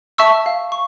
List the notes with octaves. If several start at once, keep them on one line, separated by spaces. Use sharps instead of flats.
E5 A5 C#6 E6
F5
C#6